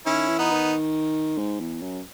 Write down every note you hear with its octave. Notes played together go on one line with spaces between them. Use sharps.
D#3 C#4 E4
E3
B3 D#4
D#3
G#2
E2
F#2